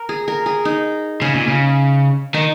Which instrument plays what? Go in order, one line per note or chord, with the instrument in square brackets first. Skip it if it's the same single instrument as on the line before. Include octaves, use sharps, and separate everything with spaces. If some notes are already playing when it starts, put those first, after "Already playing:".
Already playing: [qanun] A#4
G#4
A#4
G#4
D#4
[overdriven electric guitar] C#3 [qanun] C#4
[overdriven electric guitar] A#2
C#3
[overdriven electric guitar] D#3 [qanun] D#4